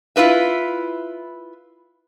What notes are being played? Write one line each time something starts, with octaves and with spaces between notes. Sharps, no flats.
E4 F4 B4 E5